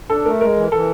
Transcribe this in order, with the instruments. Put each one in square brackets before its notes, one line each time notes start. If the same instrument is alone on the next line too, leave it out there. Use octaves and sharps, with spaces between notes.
[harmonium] D4 [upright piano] A4
[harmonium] A3 [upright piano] A#4
[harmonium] G#3 [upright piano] A#4
[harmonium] E3
[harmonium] E3 [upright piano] A4